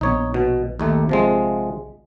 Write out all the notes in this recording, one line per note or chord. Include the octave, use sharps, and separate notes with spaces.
A#1 B3 D#4 C#5
B2
D#2 D#3 A3
C3 F3 G#3